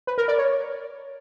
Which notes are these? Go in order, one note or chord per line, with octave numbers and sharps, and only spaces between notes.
B4
A#4
D5
C#5